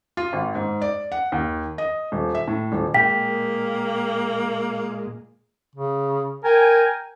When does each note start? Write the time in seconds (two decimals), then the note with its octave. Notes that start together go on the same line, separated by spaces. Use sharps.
0.17 F4
0.33 G#1
0.55 G#2
0.82 D5
1.12 F#5
1.32 D#2
1.78 D#5
2.12 D#1
2.35 E5
2.48 A2
2.72 D#1
2.94 A#2 G#3 A#3 G5 B6
5.76 C#3
6.44 A#4 G5 G#5